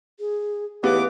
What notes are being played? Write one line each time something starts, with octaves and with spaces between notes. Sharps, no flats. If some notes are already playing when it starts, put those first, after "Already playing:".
G#4
C#2 E3 B3 G4 F5 D6